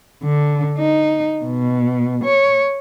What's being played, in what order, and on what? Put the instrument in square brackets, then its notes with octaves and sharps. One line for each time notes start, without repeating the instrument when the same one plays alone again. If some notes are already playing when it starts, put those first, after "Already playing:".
[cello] D3
D#4
B2
C#5